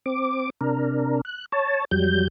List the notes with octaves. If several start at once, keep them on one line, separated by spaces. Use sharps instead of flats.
C4 D6
C3 D4 A#4
F#6
C#5 A5
F2 F#3 G3 G6